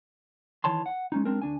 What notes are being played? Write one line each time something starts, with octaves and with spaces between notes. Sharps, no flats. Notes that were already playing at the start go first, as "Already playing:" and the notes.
D#3 E3 C#5 A5 C6
F#5
G#3 C#4 D#4
G#3 C4 D4 A#4
D2 D4 G#5